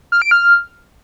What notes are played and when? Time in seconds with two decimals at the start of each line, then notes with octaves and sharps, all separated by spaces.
0.12 F6
0.22 D7
0.31 F6